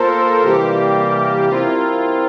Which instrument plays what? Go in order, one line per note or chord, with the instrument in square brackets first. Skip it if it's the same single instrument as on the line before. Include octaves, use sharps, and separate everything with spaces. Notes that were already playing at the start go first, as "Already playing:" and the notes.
Already playing: [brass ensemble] A#3 F4 C5 [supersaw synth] A4 A#4
[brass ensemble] C3 E3 G3 A#3 [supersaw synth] G4
[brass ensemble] G3 C4 E4 A#4 [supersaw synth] F4